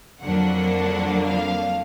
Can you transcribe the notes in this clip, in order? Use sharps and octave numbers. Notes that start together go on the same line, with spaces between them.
F2 D3 F#3 A#3 D4 F#5
F5